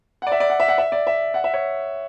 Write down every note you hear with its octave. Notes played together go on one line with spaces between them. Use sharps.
D5 F#5
E5
D5
F#5
E5
F#5
E5
D5
E5
F#5
E5
C#5